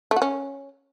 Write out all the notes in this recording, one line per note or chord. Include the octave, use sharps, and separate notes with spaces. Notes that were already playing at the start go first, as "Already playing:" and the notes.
A3
F#4
C#4